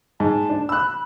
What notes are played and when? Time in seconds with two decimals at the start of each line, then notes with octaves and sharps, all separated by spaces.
0.20 G#2 A5
0.50 D4
0.69 B5 E6 F#6